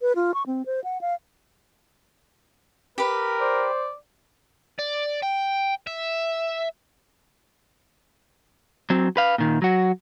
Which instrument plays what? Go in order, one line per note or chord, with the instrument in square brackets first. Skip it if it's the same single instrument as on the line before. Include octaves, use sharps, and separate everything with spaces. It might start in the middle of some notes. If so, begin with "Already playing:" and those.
[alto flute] B4
F4
C#6
C4
C5
F#5
F5
[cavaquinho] G4 B4 [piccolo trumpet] A#4
[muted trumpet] C5 [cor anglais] D5
[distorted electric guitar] D5
G5
E5
[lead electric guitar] F#3 C4
B4 F5
A#2 D#3
F#3 F#4